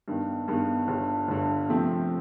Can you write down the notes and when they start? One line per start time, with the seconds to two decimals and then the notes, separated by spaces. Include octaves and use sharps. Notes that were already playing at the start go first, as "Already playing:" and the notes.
0.08 G2 D#3 G3 B3
0.48 G2 D#3 G3 B3
0.88 G1 G2 D3
1.28 G1 G2 D3
1.69 C3 F3 A3 C4